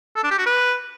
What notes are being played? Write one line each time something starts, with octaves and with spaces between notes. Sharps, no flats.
A4
D4
G4
F#4
B4